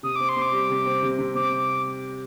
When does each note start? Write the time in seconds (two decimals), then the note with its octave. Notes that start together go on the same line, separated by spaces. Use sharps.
0.03 C3 D#6
0.16 C4 D6
0.29 C6
0.36 C4
0.42 D6
0.52 G3
0.70 C3
0.86 C4
1.03 C3
1.19 C3
1.35 C4 D6